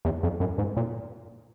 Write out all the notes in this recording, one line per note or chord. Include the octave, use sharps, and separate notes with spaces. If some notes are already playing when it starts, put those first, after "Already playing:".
E2
F2
F#2
G#2
A#2